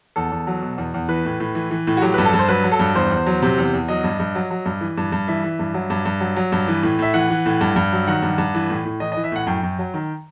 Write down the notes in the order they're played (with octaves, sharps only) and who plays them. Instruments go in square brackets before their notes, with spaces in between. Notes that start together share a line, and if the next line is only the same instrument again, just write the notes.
[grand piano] E2 A4
E2
F#3
B2
E2
E2
E3 B4
A2
A2
E3
E3
A2
F#4
F#3 G4
G2 B4
A4
G2
C5
F#3 B4
F#3
A4
G2
E2 C5
E2
F#3
C3
E2
E2
F#3 D#5
G2
G2
F#3
F#3
G2
E3
G2
G2
E3 E5
E3
G2
F#3
G2
G2
F#3
F#3
G2
E3
A2
A2 E5
E3 F#5
E3
A2
G2
G2
F#3
D#3 F#5
G2
G2
E3
A2
A2
E3 D#5
D#5
E3
E5
A2 F#5
F#2 G5
F#2
F#3
D#3